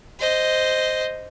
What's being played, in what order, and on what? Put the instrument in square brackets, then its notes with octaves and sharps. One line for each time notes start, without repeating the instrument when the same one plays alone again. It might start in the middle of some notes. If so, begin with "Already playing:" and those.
[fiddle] C5 D#5